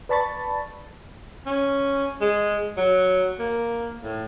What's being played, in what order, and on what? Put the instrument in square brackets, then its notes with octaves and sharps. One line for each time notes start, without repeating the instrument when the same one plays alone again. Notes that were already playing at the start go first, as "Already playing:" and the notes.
[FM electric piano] B4 D5 A5 B5 C#6 A6
[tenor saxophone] C#4
G#3
F#3
A#3
A2